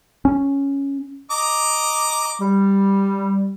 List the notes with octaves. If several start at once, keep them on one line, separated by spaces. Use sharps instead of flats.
C#4
D#5 A#5 D6
G3